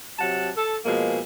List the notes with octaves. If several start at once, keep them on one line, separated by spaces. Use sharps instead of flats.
C3 F#3 F#5 A5
A4
B2 F3 G#3 A#3 G#4